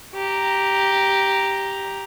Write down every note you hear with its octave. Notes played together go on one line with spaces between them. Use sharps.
G4 A#5